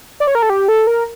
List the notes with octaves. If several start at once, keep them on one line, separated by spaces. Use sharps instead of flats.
D5
C#5
A#4
A4
G4
A4
A#4